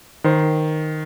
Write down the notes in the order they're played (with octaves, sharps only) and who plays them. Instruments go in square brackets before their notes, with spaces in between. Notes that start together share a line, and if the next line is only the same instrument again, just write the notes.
[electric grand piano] D#3 C5